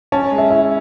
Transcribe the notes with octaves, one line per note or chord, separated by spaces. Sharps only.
C#4 A5
G#3
E5
E4 E5